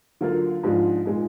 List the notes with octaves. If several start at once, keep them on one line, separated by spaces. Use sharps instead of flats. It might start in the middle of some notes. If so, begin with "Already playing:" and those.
D3 F#3 A#3 F4
G#2 F3 G#3 D4 F4
A#2 G#3 D#4